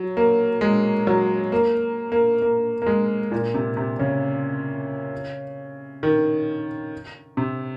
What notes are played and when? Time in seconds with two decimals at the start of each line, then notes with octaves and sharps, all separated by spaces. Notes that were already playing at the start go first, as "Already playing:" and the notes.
Already playing: F#3
0.17 A#3
0.61 G#3
1.07 F#3
1.52 A#3
2.12 A#3
2.42 A#3
2.82 A#3
2.86 G#3
3.32 A#2
3.54 C3
3.77 C3
3.99 C#3
6.03 D#3
7.37 C3